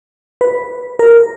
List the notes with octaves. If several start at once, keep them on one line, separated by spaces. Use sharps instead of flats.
B4
A#4